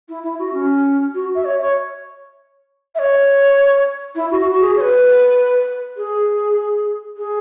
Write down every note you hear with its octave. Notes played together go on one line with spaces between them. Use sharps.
E4
E4
F#4
C#4
F#4
E5
C#5
C#5
E5
C#5
E4
F#4
F#4
G#4
C#5
B4
G#4
G#4